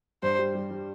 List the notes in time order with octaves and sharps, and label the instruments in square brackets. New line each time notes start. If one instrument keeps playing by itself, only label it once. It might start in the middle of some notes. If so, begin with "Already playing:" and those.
[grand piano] G2 [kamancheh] C5
[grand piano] G3
G3
G3